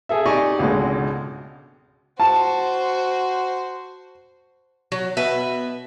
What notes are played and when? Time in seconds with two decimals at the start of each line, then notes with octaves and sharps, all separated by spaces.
0.09 G#4 A4 E5
0.25 D#4 G4 D5 D#5 G#5 C#6
0.58 G#1 C#2 B2 D3 G#3
2.20 F#4 C5 A5
4.92 F#3
5.17 B2 B4 E5